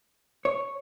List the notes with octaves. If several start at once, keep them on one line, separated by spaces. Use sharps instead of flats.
C#5